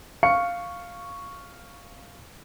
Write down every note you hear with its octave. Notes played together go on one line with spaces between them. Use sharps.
F5 C#6 C#7